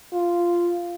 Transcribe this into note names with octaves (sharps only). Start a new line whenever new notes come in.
F4